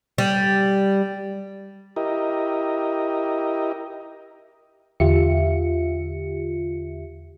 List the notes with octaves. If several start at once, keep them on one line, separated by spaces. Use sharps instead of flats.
G3
E4 G4 A#4 D#5
E2 D3 F4 G4 E5 C#7